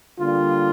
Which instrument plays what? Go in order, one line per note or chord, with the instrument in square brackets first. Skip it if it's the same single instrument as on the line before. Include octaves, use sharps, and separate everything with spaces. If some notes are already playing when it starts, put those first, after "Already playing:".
[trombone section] D3 G3 A#3 F4